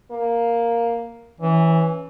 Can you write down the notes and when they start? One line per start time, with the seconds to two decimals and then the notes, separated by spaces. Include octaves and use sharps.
0.11 A#3
1.41 E3 C#4